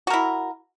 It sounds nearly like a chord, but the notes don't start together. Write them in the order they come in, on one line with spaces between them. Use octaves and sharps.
F#4 A#4 E4